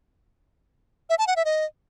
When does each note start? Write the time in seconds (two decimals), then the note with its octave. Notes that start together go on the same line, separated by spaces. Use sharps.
1.10 E5
1.19 A5
1.27 F#5
1.36 E5
1.45 D#5